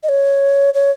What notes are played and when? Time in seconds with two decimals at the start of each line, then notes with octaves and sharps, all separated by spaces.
0.03 D#5
0.09 C#5
0.74 C#5